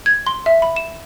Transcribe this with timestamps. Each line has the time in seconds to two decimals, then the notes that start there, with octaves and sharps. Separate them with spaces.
0.06 G#6
0.27 C6
0.46 E5
0.62 B5
0.76 E7